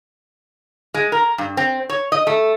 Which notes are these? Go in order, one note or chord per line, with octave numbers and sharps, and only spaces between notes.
G#3
A#4
G2
C4
C#5
D#5
A3